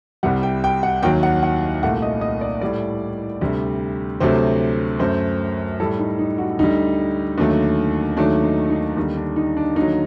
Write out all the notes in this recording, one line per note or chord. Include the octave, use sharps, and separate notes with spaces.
C2 C3 G3 F#5
G5
G5
F#5
D#2 D#3 F#3 G5
F#5
F#5
C2 A#2 A3 F#5
D#5
D#5
D5
A2 G3 D5
D2 C3 G3
D2 C3 F#3 A3 C5
F#2 F#3 A3 C5
A2 G3 A4
D#4
D#4
F#4
D2 D3 G3 D#4
D#2 D3 F#3 A3
D#2 D#3 F#3 A3 D4
D#4
D#4
D#2 D3 G3 D#4
D4
D#4
D4
D#2 D3 F#3 D#4